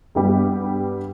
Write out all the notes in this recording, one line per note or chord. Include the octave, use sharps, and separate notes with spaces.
G2 G3 B3 G4